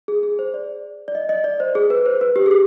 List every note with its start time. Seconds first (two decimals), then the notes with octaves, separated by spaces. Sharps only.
0.08 G#4
0.23 G#4
0.39 C5
0.54 D5
1.08 D5
1.15 D#5
1.29 D#5
1.44 D5
1.60 C5
1.75 G#4
1.90 B4
2.06 C5
2.21 B4
2.36 G4
2.46 G#4
2.51 G4